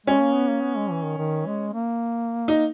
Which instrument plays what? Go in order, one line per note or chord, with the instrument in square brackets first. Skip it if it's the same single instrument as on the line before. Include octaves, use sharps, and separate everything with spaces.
[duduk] G#3 [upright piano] C#4
[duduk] A#3
B3
A#3
B3
G#3
E3
D#3
D#3
G#3
A#3
[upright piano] D#4